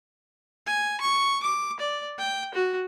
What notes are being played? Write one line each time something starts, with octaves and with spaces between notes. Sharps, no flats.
G#5
C#6
D6
D5
G5
F#4